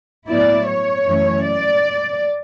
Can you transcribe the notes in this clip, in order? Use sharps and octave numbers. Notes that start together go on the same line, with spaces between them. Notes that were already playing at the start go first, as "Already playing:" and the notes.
A2 F#3 B3 E4 D5
C#5
F#2 E3 A3 C#4
D5